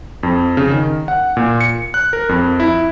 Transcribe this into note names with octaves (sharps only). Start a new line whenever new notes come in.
F2
C#3
D#3
F#5
A#2
C#7
F#6
A#4
F2
E4